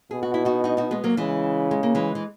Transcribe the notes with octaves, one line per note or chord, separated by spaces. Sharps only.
B2 G#4
F#4
E4
D#4 F#4
D#4 F#4
D#4 F#4
G#3 B3
F#3 A#3
C#3 E3 G#3
G#3
A#3
E3 G#3
E3